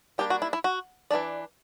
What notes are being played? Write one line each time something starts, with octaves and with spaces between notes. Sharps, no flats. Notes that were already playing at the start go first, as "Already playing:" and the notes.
G3 A#3 D4 G4
F#4
E4
E4
F#4
E3 A#3 D4 D5